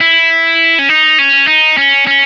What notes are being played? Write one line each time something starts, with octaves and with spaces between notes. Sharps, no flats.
E4
C#4
D#4
C#4
D#4
C#4
C#4